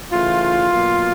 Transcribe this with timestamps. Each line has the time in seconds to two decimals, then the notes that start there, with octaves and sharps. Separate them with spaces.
0.11 C#3 E3 A3 F4
0.70 B2 F#3 A#3